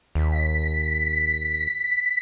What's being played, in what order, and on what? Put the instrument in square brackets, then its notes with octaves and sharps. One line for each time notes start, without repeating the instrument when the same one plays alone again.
[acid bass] D#2 [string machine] B6